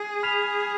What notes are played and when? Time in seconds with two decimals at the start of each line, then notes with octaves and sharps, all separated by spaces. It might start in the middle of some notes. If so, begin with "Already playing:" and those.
Already playing: G#4
0.23 B5 F6 B6 F7